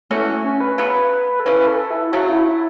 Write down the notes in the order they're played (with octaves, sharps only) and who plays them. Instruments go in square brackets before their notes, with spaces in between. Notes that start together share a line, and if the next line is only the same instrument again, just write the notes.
[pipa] E3 C#4 F#4 [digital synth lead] A3
[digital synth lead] C#4
B4
[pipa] C#3 F#3 B3 [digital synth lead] B4
[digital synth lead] A4
[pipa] C#3 E3 C#4 [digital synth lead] B4
[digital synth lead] B4
A4
E4
[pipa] C#3 F#3 A3 [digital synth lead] F#4
[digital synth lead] E4
E4